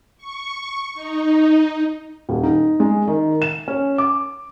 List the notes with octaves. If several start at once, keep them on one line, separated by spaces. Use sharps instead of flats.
C#6
D#4
D#1
D#4
G#3
D#3
E7
C#4
D6